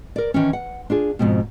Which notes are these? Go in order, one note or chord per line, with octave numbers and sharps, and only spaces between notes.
A#4 D5
D#3 E3 C#4
F#5
D4 F4 G#4
F2 G#2 B2